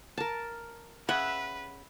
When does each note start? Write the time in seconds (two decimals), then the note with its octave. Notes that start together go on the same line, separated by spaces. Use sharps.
0.17 A#4 A5
1.09 C#3 B4 E5 F#5